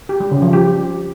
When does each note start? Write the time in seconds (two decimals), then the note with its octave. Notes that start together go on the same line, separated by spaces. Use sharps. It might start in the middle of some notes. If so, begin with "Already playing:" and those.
0.09 G4
0.20 G3
0.31 C#3
0.42 F3
0.53 G4